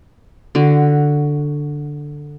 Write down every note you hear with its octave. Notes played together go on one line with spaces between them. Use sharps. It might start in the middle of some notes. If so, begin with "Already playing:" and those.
D3 F#4